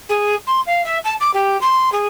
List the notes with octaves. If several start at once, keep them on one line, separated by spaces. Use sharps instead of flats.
G#4
C6
F5
E5
A5
D6
G4
C6
G#4